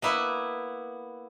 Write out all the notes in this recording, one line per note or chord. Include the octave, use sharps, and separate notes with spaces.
A#3 B3 E4